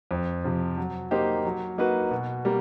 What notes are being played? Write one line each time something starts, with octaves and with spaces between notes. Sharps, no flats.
F2
C3 F3
F#3
A#3 D#4 G4 C5
F#3
A#3 D#4 F#4 B4
B2
G3 A#3